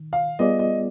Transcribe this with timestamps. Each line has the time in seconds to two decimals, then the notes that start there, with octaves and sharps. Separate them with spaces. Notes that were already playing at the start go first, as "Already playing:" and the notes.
Already playing: D#3
0.13 F5
0.39 G3 B3 F4 G#4 D5 D#5
0.59 D#5